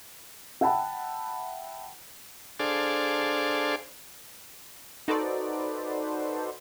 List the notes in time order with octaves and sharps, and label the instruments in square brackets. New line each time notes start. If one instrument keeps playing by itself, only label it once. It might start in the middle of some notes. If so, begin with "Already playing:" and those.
[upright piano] E5 F#5 G5 A5 B5
[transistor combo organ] D4 G#4 A4 C5 D5 F5
[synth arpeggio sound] D#4 F#4 A4 B4 C5 D5